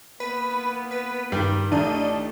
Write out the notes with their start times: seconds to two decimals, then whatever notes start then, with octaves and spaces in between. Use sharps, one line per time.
0.20 A#3 B3 B4
0.91 B4
1.32 G2 D#3 G3 B4
1.72 A1 A3 D4 D#4 G4 D#5